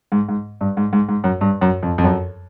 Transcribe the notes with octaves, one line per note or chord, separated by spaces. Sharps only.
G#2
G#2
G2
G#2
G#2
G#2
F#2
G2
F#2
F2
F2
F#2